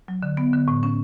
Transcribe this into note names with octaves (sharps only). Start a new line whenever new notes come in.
F#3
D3
B3
D3
A2
C#4